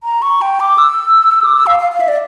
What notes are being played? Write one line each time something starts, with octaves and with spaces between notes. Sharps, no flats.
A#5
C#6
G5
D6
E6
D6
E6
F5
F5
F5
E5
D5